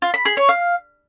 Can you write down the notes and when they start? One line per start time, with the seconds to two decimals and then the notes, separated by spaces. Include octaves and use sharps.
0.02 F4
0.14 B5
0.25 G#4
0.37 C#5
0.49 F5